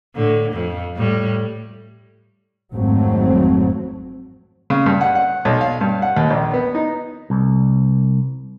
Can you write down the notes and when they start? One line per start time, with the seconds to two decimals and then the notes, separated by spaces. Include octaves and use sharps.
0.16 A2 D3
0.52 F2 F3
0.97 A2 G3
2.73 G#1 F2 F#3 A3 C4
4.70 C#3
4.86 G2
5.01 F#5
5.15 F#5
5.45 B1
5.61 F5
5.81 G2
6.02 F#5
6.17 D#2
6.31 A#1
6.54 B3
6.75 D#4
7.30 C2